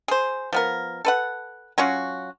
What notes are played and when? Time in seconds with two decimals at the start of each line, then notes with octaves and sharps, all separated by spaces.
0.08 G#4 C5
0.53 F3 B3 A#4
1.05 A4 B4 F#5
1.78 F#3 C#4 F4 F#4